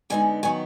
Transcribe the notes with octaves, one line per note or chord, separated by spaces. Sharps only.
D3 G#3 B3 D#4 G#5
D#3 F#3 B3 G#5